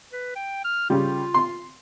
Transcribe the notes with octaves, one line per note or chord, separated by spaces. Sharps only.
B4
G5
F6
C#3 G3 F4
C6